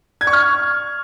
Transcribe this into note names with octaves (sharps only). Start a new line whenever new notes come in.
G#6
C#6
F6